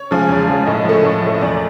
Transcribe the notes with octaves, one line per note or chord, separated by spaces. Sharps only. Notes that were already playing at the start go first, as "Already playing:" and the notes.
Already playing: C#5
C#3 F3 G#3
E2
C#3 F3 G#3
A2 D#5
F3 A3
A2
F3 A3
D#5
E2 D5